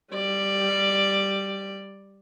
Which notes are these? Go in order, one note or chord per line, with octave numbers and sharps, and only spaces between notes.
G3 D5